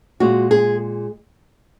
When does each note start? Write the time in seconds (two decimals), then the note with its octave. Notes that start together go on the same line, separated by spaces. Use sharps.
0.20 A#2 G#3 F#4
0.51 G#4